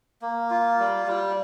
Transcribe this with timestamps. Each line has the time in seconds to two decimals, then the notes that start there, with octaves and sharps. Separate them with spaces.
0.22 A#3
0.50 F4
0.79 G3
1.07 G3